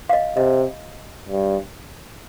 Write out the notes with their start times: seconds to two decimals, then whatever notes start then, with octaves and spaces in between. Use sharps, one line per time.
0.09 F5
0.13 D#5
0.36 C3 D#5
1.29 G2